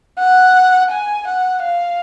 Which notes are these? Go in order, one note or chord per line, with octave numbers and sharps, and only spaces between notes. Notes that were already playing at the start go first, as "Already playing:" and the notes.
F#5
G#5
F#5
F5